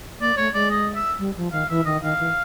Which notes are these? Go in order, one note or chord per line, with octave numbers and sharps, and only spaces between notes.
A#3 D5
A3 C#5
G#3 D5
D#5
E5
G3
F3
D#3 F5
E3 E5
D#3 D#5
D#3 F5
E3